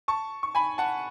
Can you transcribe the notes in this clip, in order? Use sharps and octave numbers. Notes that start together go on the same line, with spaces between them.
A5 C#6
C#6
G#5 B5
F#5 A5